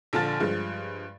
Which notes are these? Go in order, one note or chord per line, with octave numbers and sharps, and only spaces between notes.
A#1 D3 F4 A5 F6 A6
G2 F3 G#3